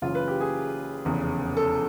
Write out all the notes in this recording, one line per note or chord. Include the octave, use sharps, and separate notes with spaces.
F#1 F#2 C#3 E3 F4
B4
G4
G#4
F1 E2 C#3
A4